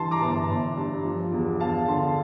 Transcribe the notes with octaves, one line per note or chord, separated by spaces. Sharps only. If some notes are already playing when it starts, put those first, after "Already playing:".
Already playing: G2 E3 A5 C6
A#5 D6
G1
A5 C6
G1
G2
F3
E2
E2 F5 A5
D3 A5 C6